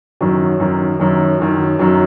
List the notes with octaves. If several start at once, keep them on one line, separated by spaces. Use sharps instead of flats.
F#2 D#3 F#3
F#2 D#3 F#3
F#2 D#3 F#3
F#2 D#3 F#3
F#2 D#3 F#3